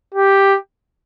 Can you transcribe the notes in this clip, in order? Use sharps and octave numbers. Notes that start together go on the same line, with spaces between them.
G4